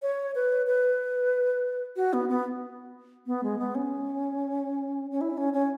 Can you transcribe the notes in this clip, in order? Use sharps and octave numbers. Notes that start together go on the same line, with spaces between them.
C#5
B4
B4
F#4
B3
B3
B3
G#3
B3
C#4
C#4
E4
C#4
C#4